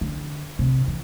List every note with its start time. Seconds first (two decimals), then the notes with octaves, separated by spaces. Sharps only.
0.01 D3
0.59 C3
0.87 E3